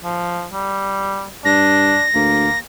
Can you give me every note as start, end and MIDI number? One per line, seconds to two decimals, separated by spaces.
0.02 0.47 53
0.53 1.27 55
1.45 1.96 43
1.45 2.05 62
1.45 2.59 94
2.14 2.48 38
2.14 2.58 58